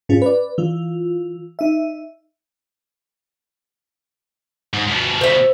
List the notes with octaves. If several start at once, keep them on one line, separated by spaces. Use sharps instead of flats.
G#2 C#4 F4 G#4
B4 D5
E3 F4
D#4 E5
G#2
D2 B2
C5 E5